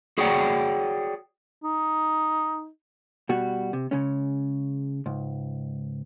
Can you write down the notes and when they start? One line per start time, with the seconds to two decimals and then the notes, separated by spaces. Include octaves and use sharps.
0.18 F#4 G#4 C#5 D5 F#5 G5
1.64 D#4
3.29 B2 G3 F#4
3.73 C3
3.91 C#3 G#3 C#4
5.06 C#2 G#2